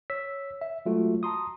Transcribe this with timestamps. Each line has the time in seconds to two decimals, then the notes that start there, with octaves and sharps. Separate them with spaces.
0.10 C#5 E6 B6
0.61 E5
0.86 F#3 G#3 A3 F4 F#4
1.23 A5 A#5 C6 D#6